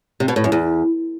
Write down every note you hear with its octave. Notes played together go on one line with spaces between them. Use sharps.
C3
B2
A2
F#2
E2